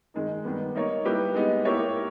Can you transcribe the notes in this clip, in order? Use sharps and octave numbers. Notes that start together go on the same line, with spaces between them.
D#3 G#3 D#4
D#3 G3 B3
A#3 D#4 A#4 C#5
G3 A#3 E4 G4 B4
G#3 B3 D#4
A#3 E4 G4 A#4 C#5